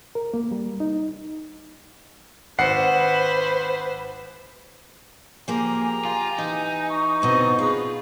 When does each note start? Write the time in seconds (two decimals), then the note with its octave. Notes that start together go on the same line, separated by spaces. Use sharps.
0.15 A#4
0.34 A#3
0.52 G3
0.80 D#4
2.59 G#1 B4 C5 F#5 C7
5.48 F3 A#3 G4 G#4 G#5 A#5
6.05 F4 G#5
6.38 E3 D#4
6.90 C#6
7.22 D2 B2 B3 C4 D#5
7.59 F4 G#4 B4